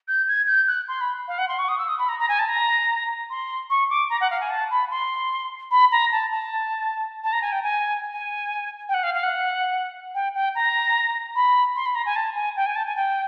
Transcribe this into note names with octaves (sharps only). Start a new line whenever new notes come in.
G6
G#6
G6
F#6
C6
B5
F5
F#5
C6
C#6
D#6
E6
D#6
B5
A#5
A#5
G#5
A5
A#5
C6
C#6
D6
A#5
F#5
F5
G#5
A5
B5
C6
B5
A#5
A5
A5
A5
A#5
G#5
G5
G#5
G#5
G5
F#5
F5
F5
F#5
G5
G5
A#5
B5
C6
B5
A#5
G#5
A5
G#5
G5
G#5
A5
G#5
G5